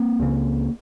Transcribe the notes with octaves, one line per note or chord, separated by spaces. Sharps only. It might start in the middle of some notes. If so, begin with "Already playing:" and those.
Already playing: A#3 C4
C#2 C#3